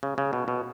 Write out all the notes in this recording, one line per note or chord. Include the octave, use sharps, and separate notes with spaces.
C#3
C#3
B2
B2